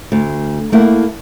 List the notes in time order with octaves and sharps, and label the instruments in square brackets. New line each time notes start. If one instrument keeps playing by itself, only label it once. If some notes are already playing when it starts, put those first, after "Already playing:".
[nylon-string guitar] D2
A3 A#3 E4 F#5